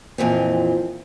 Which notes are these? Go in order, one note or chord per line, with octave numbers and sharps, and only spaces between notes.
F2 A#2 E3 C4